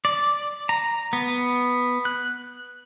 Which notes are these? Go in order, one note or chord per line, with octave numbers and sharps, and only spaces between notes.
D5
A#5
B3
F#6